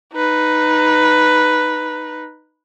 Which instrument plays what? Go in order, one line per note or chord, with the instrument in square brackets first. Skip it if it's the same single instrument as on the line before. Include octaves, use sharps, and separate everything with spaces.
[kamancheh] D#4 B4